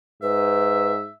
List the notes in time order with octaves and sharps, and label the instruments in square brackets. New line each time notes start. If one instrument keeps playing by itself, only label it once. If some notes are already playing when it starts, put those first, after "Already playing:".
[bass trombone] G#2 [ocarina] B4 [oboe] E5